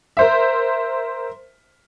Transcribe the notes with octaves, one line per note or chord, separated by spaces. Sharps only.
A#4 C5 E5